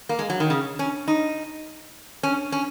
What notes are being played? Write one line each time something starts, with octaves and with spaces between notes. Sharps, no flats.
A#3
G#3
F#3
D#3
C#3
C#4
D#4
C#4
C#4